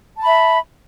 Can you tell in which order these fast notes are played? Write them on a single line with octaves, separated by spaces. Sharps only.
A5 B5 E5